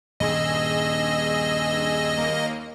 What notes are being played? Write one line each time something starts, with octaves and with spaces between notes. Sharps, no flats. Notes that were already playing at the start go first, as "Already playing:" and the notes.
D#1 G2 G#4 D#5 E6
D#2 A#3